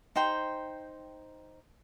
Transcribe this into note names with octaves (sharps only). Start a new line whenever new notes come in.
D#4 C5 G5 C6